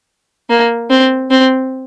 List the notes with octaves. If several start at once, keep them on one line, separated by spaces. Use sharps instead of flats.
A#3
C4
C4